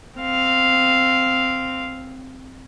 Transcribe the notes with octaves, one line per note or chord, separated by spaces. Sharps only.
C4 F5